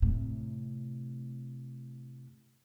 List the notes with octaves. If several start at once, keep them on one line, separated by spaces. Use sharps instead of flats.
A2 C3